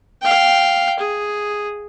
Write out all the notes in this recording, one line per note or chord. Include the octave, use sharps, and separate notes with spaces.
F5 G5
G#4